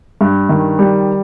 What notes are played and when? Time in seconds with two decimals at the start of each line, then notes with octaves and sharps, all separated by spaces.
0.21 G2
0.49 D#3
0.79 G3